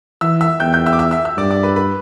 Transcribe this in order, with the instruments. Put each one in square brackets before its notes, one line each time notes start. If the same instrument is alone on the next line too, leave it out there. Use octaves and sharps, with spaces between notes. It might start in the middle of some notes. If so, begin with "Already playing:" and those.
[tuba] E3 [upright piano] E5 E6
[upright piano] E5 E6
[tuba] E2 [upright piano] G5 G6
[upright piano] G5 G6
E5 E6
D6
E5 E6
E5 E6
E5 E6
[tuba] G2 [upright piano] D5 D6
[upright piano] D5 D6
B4 B5
B4 B5